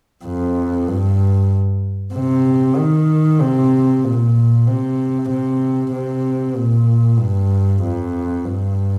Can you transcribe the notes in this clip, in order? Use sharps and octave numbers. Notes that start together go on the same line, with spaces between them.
F2
G2
C3
D#3
C3
A#2
C3
C3
C3
A#2
G2
F2
G2